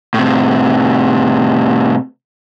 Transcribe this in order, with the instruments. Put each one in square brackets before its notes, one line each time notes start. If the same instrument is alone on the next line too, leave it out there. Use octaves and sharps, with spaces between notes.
[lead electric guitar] A2 C3